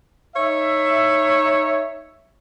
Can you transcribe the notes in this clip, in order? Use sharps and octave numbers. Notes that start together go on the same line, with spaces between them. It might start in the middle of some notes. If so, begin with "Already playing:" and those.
D#4 C#5 E5